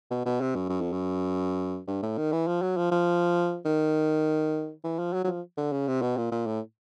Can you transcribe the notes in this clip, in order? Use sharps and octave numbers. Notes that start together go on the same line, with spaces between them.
B2
B2
C3
F#2
F#2
F2
F#2
G2
A2
D#3
E3
F3
F#3
F3
F3
D#3
E3
F3
F#3
F#3
F3
D3
C#3
C3
B2
A#2
A#2
A2